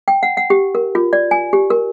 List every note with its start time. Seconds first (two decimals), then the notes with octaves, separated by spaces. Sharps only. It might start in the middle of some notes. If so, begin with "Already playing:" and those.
0.08 G5
0.23 F#5
0.37 F#5
0.50 G4
0.75 A#4
0.95 F4
1.13 D5
1.31 G#5
1.53 G4
1.70 A#4